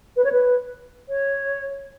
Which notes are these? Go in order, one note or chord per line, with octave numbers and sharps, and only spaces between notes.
B4
C#5
B4
C#5